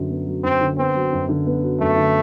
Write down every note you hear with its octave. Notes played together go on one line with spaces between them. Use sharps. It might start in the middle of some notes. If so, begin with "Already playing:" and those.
Already playing: F#2 D3 F#3 B3
B3
F#3
F#2 C4
D3
B3 C4
F#3
F#2
D3
B3
F#3
F#2 A3
D3